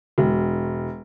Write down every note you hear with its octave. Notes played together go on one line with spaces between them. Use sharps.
E1